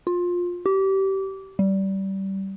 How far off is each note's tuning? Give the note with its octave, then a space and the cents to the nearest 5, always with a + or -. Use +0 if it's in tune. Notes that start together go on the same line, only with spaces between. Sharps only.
F4 +20
G4 -25
G3 -20